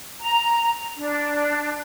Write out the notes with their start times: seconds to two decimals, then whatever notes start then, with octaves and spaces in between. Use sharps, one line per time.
0.20 A#5
0.97 D4